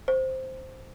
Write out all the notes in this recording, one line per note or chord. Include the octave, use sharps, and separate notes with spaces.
C5